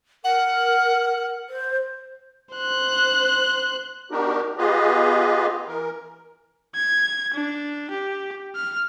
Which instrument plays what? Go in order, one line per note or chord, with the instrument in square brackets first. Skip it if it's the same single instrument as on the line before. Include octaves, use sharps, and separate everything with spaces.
[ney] A#4 [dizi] F#5
[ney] C5
[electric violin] C5 F#6
[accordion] B3 D4 D#4 F#4 G4 A#4
B3 F4 G4 G#4 B4 D#5
E3 A#4
[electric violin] G#6
D4
G4
F6